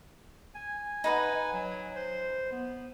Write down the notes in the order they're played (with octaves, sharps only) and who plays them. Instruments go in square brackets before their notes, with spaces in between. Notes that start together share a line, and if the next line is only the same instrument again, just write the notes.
[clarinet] G#5
[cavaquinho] D#4 B4 F#5
[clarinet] F#3
C5
B3